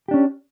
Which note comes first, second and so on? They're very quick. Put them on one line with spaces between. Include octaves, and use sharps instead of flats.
G4 D4 C#4